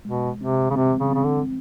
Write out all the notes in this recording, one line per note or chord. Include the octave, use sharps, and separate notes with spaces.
B2 G#3
C3 C4
C#3
C3 C4
C#3
C#3 C4
D3